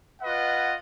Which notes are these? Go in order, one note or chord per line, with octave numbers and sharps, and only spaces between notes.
F4 B4 D#5 F#5